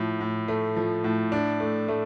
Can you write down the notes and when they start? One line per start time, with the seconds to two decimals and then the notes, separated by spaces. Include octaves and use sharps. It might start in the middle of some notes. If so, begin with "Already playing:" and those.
Already playing: A2 F3
0.20 A2
0.48 A3
0.76 F3
1.04 A2
1.32 D4
1.60 A3
1.88 A3